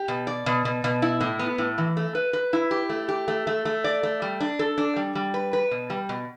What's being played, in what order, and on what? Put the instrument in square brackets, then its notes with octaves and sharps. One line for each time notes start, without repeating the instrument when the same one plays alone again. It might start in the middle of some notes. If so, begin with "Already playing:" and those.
Already playing: [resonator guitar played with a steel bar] G4
B2
D5
B2
B2
B2
E4
A2
B3
A2
E3
A3
B4
B4
E4
G4
A3
G4
A3
A3
A3
D5
A3
G3
D4
A4
D4
G3
G3
B4
B4
B2
G3
B2